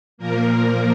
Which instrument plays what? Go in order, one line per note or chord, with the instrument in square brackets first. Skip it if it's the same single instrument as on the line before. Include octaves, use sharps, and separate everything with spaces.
[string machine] A#2 F3 A#3 A#4